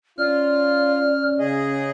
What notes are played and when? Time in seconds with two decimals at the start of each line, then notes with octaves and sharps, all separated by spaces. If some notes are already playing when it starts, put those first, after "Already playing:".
0.19 C#4 F4 D5 F6
1.39 C#3 G#4 D#5